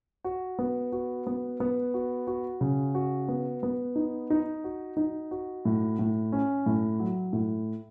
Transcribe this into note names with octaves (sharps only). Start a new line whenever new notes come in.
F#4
B3
F#4
B3
B3
F#4
F#4
C#3
F#4
B3
B3
D#4
D#4
F#4
D#4
F#4
A2
A2
C#4
A2
F#3
A2